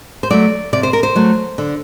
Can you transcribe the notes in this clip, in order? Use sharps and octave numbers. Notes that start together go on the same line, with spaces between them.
C5
F#3 A3 D5
C3 D5
C5
A#4
C5
F#3 A3
D3